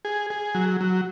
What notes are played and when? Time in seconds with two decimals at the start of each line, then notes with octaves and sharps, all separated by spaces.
0.05 G#4
0.30 G#4
0.55 F#3
0.81 F#3